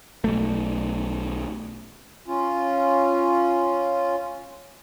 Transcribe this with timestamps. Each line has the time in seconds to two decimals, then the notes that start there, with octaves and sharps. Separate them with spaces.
0.24 B1 A3
2.28 C#4 F4